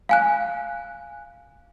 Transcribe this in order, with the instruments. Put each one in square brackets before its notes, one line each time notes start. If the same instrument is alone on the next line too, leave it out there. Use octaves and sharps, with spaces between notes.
[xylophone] F5 G#5 F#6